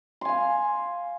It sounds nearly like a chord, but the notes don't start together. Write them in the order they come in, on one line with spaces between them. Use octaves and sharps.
C6 G#5 F5